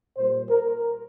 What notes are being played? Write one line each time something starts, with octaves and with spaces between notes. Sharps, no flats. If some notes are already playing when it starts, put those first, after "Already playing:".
A#2 G3 C5
A#4